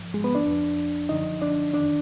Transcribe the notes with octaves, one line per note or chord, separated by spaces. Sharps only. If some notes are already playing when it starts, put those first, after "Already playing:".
Already playing: G#2 F3
G#3 G#4
B3 B4
D4 D5
F2 F3
F#2 D3 F3 D#4 D#5
D4 D5
F2 D#3 D4 D5